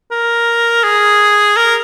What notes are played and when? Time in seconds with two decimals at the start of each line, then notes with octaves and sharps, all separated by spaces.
0.11 A#4
0.84 G#4
1.57 A#4